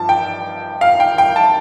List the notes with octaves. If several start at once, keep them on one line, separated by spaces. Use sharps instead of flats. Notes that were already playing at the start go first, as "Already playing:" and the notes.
Already playing: G2 F3 A5
G5
F5
G5
G5
A5